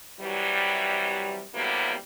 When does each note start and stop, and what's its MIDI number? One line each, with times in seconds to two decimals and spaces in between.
0.20 1.43 48
0.20 1.43 52
0.20 1.43 54
0.20 1.43 55
1.54 1.94 45
1.54 1.94 48
1.54 1.94 54
1.54 1.94 55
1.54 1.94 58
1.54 1.94 59